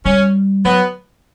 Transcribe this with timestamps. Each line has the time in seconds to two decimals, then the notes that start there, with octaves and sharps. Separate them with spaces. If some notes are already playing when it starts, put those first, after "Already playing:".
0.05 G3 C#4
0.65 F#3 B3